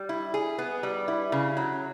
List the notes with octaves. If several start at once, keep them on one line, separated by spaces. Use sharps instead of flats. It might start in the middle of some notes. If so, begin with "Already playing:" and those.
Already playing: G3
E4
G#4
B3
G3
E4
C#3
F#3